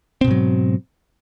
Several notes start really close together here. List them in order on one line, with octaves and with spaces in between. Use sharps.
C4 B2 G#2 F#3